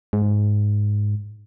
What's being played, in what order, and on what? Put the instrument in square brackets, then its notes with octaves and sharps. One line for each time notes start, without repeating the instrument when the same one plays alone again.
[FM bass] G#2